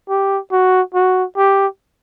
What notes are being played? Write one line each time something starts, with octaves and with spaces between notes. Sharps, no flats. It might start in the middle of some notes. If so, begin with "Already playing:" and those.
G4
F#4
F#4
G4